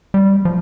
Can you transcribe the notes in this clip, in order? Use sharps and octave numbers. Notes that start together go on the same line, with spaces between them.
G3
F3